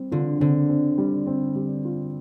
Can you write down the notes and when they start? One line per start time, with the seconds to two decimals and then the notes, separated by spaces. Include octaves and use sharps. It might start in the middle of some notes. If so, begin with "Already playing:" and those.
Already playing: G3 C4
0.12 D3 F4
0.40 D3 C4
0.69 C4
0.98 G3
1.27 C4
1.55 G3
1.85 F4